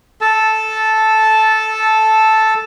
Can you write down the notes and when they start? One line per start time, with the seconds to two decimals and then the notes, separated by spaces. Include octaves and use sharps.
0.21 A4 A5